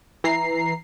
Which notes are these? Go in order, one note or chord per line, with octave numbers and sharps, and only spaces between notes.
E3 A#5 C7